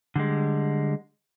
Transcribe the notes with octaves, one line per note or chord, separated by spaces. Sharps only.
D3 G3 G#3